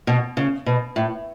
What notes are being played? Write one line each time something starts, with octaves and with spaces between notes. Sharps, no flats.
B2
C#3
B2
A2